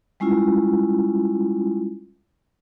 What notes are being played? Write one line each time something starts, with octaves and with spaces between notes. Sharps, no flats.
G3 G#3 C#4 E4 F4